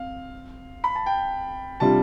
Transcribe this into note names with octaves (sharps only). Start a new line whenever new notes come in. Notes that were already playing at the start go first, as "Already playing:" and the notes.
Already playing: C4 F5
B5
A5
G5
C3 G3 D4 F4 A5